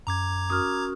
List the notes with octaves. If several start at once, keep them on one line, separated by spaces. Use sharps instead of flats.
F#2 A#5 D6 G#6
C#4 F#4 A#4 D#6 F6